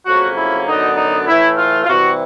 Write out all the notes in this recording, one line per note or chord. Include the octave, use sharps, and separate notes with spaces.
F2 C#3 F#3 A#3 C#4 F#4
E4
F#2 D3 F#3 B3 D4 D#4
D#4
A2 E3 A3 E4
F4
F4
C3 E3 G3 F#4